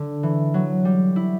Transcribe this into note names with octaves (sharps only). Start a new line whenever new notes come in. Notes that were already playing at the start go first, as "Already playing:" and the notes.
Already playing: D3
E3
F#3
G3
E4